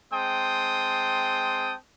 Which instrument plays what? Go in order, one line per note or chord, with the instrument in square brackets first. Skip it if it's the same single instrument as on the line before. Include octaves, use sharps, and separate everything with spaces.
[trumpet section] G#3 C4 G5 A5 C6 D#6